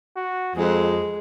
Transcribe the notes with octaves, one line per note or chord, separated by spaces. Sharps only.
F#4
F2 G#3 G#4